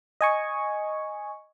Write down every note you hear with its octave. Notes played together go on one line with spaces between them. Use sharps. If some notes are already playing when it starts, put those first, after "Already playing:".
D#5 G#5 C#6